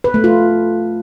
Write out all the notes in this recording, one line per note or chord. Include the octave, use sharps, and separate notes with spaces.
B4
A3
F4